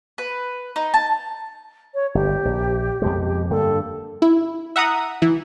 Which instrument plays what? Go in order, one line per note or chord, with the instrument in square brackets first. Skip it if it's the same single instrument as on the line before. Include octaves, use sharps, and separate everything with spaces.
[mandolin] B4
D#4
A5
[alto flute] C#5
[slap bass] G1 [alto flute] G4
[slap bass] A#1
F2 B2 G#3
[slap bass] G2 D3 A#3 [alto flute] A4
[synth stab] E4
E5 F#5 A#5 D#6
E3